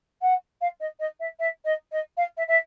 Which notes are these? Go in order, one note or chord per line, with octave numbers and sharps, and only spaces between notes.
F#5
F5
D#5
D#5
E5
E5
D#5
D#5
F5
E5
E5